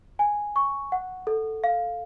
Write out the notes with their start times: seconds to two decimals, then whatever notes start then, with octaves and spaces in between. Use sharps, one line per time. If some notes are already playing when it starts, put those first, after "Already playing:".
0.19 G#5
0.56 C#6
0.92 F#5
1.27 A4
1.64 F5